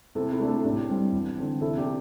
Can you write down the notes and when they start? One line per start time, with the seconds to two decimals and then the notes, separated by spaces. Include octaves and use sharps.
0.15 C3 E4 A4
0.32 E4 A4
0.40 A3 D4
0.47 E4 A4
0.64 A2 D4 G4
0.89 G3 C4
1.13 E2
1.37 D3 C4
1.61 C3 E4 A4
1.77 D4 G4